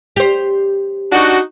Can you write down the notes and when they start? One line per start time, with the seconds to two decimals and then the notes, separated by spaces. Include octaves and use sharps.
0.16 G4 C5
1.12 D4 D#4 F#4